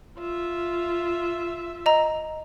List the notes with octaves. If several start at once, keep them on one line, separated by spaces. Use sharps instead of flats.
F4 E5
D#5 A#5